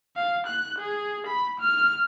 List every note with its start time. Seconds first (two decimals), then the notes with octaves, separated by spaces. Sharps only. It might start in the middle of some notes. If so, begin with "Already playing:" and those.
0.16 F5
0.47 F#6
0.79 G#4
1.27 B5
1.60 F6